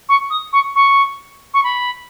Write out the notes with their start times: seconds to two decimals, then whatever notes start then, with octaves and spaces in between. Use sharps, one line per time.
0.09 C#6
0.30 D#6
0.52 C#6
0.75 C#6
1.54 C#6
1.63 B5